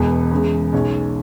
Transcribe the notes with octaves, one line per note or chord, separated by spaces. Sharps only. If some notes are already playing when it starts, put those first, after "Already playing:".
Already playing: E1 E2 B2 G#3 B3
E2 C#3 G#3
B1 B2 G#3 C#4